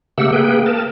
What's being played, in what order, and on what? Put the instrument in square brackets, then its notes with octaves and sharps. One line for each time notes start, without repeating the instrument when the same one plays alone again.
[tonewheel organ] C#3 A3 A#3 G4 F#5 E6
A#3 G#4 B4 G5
A#4 A5